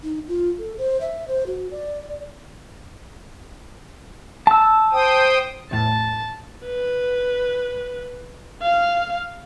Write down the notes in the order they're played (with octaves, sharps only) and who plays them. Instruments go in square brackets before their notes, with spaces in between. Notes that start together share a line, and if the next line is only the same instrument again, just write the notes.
[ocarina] D#4
F4
A4
C5
E5
C5
F#4
D5
[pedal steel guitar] A5 E6
[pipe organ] C5 G5 D#6
[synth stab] E2 A2 [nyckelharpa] A5
[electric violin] B4
F5